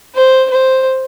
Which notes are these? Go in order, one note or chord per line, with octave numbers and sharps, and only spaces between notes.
C5
C5